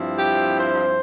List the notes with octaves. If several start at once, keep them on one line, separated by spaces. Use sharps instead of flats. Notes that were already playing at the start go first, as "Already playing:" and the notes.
Already playing: G2 F3 C4 E4
G4
C5